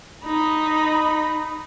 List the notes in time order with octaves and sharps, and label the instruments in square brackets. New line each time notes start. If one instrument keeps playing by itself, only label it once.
[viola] D#4 B5